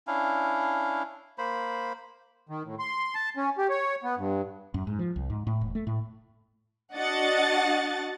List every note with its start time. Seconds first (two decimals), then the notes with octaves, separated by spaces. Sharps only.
0.07 C#4 D4 E4 F5
1.38 A#3 C5 B5
2.49 D#3
2.64 A2
2.79 C6
3.15 A5
3.37 C#4
3.58 G4
3.70 C#5
4.04 B3
4.18 G2
4.74 F#2
4.87 G#2
4.99 F3
5.16 C2
5.30 G#2
5.47 A2
5.61 E1
5.75 A3
5.87 A2
6.95 D4 F#4 D#5 F#5 A5 A6